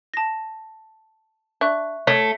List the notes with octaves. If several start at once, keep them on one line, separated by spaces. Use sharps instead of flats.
A5 A#6
D4 E5 C#6 F#6
A3 C#5